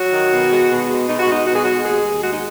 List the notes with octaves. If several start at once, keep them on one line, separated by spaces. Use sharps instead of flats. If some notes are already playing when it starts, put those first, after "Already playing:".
Already playing: F#3 F#4
D#3
B2
G#3
B2
G#3
B2 D#4
F#4
G#3 D#4
B2 F#4
G#4
G#3 F#4
D#2 G#4
D#2
G#3 F#4
D#4